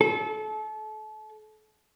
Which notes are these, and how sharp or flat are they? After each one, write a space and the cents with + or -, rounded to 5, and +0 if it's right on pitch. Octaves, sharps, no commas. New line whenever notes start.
A4 -30